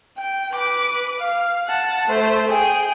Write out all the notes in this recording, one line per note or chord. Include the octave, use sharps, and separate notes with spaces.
G5
B4 D6
F5
F#5 A5
A3 C5
G#4 G5